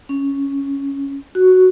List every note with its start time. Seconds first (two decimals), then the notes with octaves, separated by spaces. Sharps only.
0.09 C#4
1.35 F#4